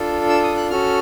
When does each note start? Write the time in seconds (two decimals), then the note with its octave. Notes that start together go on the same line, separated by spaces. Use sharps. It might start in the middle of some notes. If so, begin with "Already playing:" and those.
Already playing: D4 F4 A4
0.29 E6
0.44 D#6
0.57 F#6
0.70 C#4 F#4 A4 F6